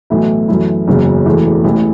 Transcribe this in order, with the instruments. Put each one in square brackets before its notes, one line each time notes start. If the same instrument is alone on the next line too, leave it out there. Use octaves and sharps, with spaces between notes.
[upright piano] B1 A2 E3 A3 E4
F#2 E3 A3 E4
F#1 E2 C#3 F#3
E1 E2 E3 A3
A1 A2 E3